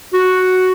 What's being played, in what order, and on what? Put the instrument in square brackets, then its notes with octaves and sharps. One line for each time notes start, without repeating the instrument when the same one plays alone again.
[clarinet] F#4